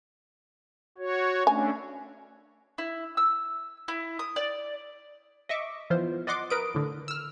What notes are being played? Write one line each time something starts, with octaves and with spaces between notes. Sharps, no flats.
F#4 C#5
A3 C#4 D4 G#5
E4
E6
E4
D#6
D5
D#5 E5 C#6 D6
E3 F3 B3 F4 C5
D5 D#5 F#5 C6 D6
A#4 B4 D#6 D7
A2 D3
E6 F6